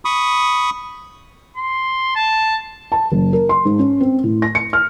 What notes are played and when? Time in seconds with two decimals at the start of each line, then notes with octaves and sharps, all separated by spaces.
0.05 B5 C#6 D#6
1.57 C6
2.15 A5
2.92 A5
3.12 F#1
3.33 A#4
3.49 C6
3.65 G#2
3.79 C#4
4.01 C4
4.24 A2
4.42 A#6
4.55 C#7
4.73 F6